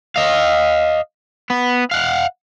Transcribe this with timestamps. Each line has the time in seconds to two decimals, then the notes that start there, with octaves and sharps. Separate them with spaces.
0.16 D#5 F5
1.50 B3
1.91 F5 F#5